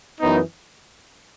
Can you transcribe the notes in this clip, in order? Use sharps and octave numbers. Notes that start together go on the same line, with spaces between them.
F#2 E3 B3 D#4